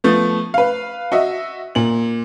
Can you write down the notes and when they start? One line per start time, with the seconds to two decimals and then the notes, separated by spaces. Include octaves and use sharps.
0.04 F3 A3 B3
0.54 B4 F5
1.12 F#4 D#5 E5
1.75 A#2 F#7